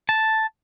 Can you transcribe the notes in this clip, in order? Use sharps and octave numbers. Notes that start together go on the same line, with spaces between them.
A5